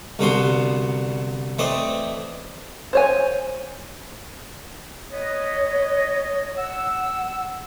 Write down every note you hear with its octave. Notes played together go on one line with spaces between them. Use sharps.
C2 D3 B3 F#4 C6
E3 A3 C4 D5 D#5
C5 C#5 G#5
B3 C#5 D#5
F#5 E6